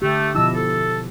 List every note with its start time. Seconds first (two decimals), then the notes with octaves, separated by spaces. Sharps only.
0.02 D3 A3 G4
0.35 B2 F3 E4 D#5 A5 E6
0.55 A4